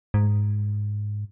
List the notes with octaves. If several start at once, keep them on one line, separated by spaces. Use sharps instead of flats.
G#2